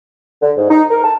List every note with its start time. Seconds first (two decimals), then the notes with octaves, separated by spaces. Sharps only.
0.42 D3
0.57 G#2
0.70 D#4
0.91 A#4
1.04 A5